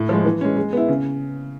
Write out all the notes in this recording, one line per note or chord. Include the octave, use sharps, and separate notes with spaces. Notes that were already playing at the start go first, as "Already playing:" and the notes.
Already playing: A2
F3 G#3
E3
G#3 C#4
G#3
B3 E4
C#3